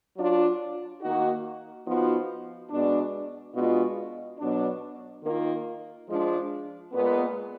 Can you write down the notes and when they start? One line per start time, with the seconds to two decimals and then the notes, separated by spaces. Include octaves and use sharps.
0.16 F#3 D4 F4
1.01 D#3 A#3 D#4 F#4
1.85 F3 B3 D#4 F#4
2.69 B2 G#3 D4
3.54 B2 G#3 D4 F4
4.39 B2 F#3 D4
5.23 D#3 A#3 F4
6.07 F3 G#3 D4
6.92 A#2 G#3 B3